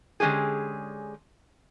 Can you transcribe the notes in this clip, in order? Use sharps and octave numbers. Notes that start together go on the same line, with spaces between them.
D3 G#3 C#4 G4 G#4